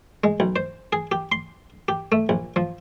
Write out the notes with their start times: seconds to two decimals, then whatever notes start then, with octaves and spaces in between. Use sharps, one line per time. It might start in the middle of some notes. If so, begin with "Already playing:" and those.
0.24 G#3
0.40 B1
0.56 C5
0.93 G#4
1.12 G4
1.32 C6
1.88 G4
2.12 A3
2.29 A#1
2.56 F3